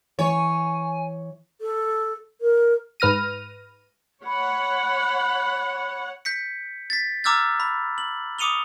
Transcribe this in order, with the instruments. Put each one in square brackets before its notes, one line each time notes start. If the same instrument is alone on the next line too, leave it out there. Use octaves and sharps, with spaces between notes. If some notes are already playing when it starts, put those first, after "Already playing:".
[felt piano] E3 [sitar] C#5 [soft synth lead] G#5
[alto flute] A4
A#4
[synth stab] G#2 B4 F6 A#6 D#7
[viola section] C#5 F#5 [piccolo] B5
[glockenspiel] G6 B6 C#7
A6 B6
A#5 D6 E6 F6 G6 A6
B5
F#7
D6 D#6 C#7 D#7 F7 G7